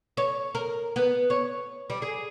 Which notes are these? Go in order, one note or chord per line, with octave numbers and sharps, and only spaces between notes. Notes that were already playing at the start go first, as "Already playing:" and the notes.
C#5
A#4
B3
C#5
G3
G#4